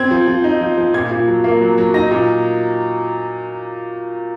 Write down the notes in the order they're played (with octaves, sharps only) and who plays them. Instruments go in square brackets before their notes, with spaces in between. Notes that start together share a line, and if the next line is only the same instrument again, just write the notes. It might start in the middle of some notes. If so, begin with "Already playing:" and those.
Already playing: [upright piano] C4 G#6
F3
F3
D#4
F3
F3
A#2 G#6
A#2
F#3
A#3
F#3
F#3
D#4 A#6
A#2